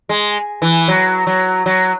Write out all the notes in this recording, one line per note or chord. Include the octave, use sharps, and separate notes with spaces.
G#3
E3
F#3
F#3
F#3